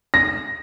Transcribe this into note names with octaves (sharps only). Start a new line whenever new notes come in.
A#6